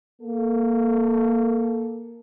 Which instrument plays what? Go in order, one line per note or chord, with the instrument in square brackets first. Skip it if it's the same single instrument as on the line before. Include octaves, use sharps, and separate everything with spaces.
[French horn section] A#3 A4